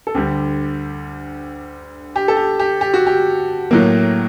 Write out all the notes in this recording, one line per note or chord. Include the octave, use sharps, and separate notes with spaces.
A4
D2 D3 G3 G4
G4
A4
G4
G4
G4
F#4
G4
A2 F#3 A#3